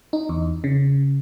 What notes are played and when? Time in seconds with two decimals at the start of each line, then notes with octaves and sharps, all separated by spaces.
0.13 D#4
0.29 E2
0.64 C#3